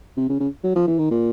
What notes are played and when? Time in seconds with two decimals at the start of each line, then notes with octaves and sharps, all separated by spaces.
0.17 C3
0.29 C#3
0.40 C#3
0.64 F#3
0.76 F3
0.87 E3
0.99 D#3
1.11 A#2